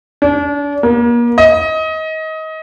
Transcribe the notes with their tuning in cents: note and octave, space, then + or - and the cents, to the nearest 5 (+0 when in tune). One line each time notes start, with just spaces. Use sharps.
D4 -35
A#3 +35
D#5 +25